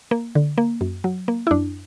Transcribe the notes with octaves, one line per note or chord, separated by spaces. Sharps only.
A#3
D3
A#3
F#2
F#3
A#3
E4
F#2 D4